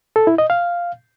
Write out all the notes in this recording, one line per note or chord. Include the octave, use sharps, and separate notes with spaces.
A4
E4
D#5
F5